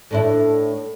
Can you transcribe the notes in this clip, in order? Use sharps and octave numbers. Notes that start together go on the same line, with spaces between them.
A2 D4 E4